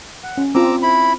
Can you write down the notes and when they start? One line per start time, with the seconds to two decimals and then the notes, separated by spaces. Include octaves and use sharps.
0.23 F#5
0.37 C#4
0.55 C4 F4 A#5 D6 E6
0.82 E4 B5